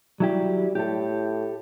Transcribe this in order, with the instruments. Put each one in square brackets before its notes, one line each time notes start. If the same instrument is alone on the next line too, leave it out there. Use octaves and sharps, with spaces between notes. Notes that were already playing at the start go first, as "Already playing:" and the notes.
[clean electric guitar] F#3 E4 G4 [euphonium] G3
[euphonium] A2 [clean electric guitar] G4 A4